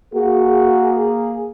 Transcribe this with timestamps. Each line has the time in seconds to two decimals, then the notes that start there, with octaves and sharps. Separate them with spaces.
0.15 A#3 F#4 G#4